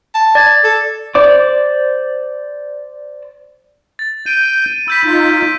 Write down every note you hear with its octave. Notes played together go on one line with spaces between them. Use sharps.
A5
D5 G#6
A4
C5 D5 D6
A6
G6 D7 D#7
B5 E6 G6 B6
D#4 F4